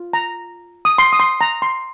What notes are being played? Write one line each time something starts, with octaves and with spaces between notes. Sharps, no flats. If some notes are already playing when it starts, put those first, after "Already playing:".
Already playing: F4
A#5
D#6
C6
D#6
C6
A#5
C6